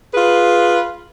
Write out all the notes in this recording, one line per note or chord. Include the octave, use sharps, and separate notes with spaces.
F4 G#4 B4